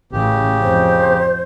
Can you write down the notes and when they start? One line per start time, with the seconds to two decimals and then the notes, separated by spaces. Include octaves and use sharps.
0.12 A1 C#3 G4
0.62 F2 C5